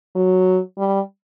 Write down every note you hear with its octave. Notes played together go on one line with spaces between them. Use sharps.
F#3
G3